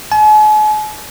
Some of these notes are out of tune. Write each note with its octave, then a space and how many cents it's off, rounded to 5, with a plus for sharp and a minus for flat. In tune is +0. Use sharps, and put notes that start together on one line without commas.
G#5 +45